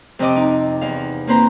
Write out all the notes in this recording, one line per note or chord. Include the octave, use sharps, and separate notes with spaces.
F2 C3 C4 D#5 D6
D#4
E2 F5
A#3 C4 B4 C5 A#5